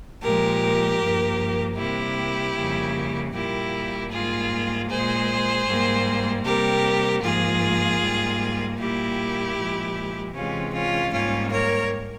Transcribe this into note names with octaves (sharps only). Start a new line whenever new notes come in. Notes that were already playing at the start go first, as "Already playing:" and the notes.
A#2 F3 G#3 G4 A#4
G2 F3 A#3
C3 G3 A#3 E4 G4
F2 C#3 G3 A#3
A#2 G3 A#3 E4 G4
G#2 G3 A#3 F4 G#4
A#2 G#3 G#4 C5
G#2 G3 A#3
C3 G3 A#3 G4 A#4
G#2 F3 A#3 F4 G#4
G#2 G3 A#3
A#2 G3 A#3 E4 G4
A#2 F3 G#3
C3 E3 G#3 C#4 F4
C#4 F4
G#2 G3 A#3 C#4 F4
A#4 C#5